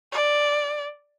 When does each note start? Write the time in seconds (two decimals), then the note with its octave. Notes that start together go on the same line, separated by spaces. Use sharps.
0.12 D5